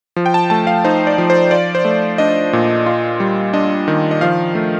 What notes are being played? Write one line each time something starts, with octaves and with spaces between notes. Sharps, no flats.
F3
G5
A5
A3 A5
F5
D#4 C5
D5
F3
C5
F4 D5
C5
A3
D4 D#5
A#2
F4
G3
D4 D#5
D#3
D#5
F3 F5
A3